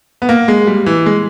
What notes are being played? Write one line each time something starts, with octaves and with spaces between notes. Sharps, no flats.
B3
A#3
G#3
G3
E3
G#3